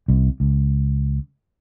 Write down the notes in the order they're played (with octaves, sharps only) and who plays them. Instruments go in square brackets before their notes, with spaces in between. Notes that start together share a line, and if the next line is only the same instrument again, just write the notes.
[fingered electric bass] C2
C#2